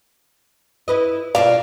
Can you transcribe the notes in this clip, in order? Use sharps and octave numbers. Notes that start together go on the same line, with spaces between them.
E4 B4 D#5
B2 A#3 D4 F4 F5